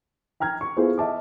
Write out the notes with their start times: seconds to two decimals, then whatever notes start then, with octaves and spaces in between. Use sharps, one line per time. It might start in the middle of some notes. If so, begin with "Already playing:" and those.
0.40 G5 A#5 F6 G#6
0.61 C#6
0.77 B3 E4 F4 G#4 A4 C5
0.98 D#5 E5 A5 D6